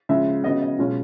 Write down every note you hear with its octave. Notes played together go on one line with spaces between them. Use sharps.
C#3 F3 G#3 E5
C#3 F#3 B3 D#5
D#5
B2 G#3 C#4 F4